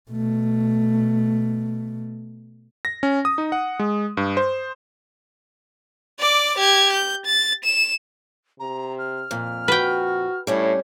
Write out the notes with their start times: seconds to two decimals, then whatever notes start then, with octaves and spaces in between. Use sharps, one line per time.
0.10 B2 A3
2.85 A#6
3.03 C#4
3.25 D#6
3.38 D#4
3.52 F#5
3.79 G#3
4.17 G2
4.37 C5
6.19 D5 D6
6.58 G4 G#6
6.93 G6
7.25 A6
7.64 E7
8.60 C3 A#5
8.98 F6
9.31 F2 A#2
9.68 F#4 B4 G5
10.47 A2 G3 C#4 D4